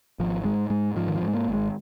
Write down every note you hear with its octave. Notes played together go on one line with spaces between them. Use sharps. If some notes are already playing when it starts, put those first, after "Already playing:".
G#1 F3
G#2 G#3
G#2 G#3
G#2 F3
D#3
F3
G#2
G#3
A#3
G#1
G#3